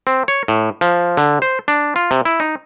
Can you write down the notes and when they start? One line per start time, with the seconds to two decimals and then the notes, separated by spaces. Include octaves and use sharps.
0.07 C4
0.28 C#5
0.48 A2
0.81 F3
1.17 D3
1.42 C5
1.68 D4
1.96 F4
2.11 C3
2.25 E4
2.40 D#4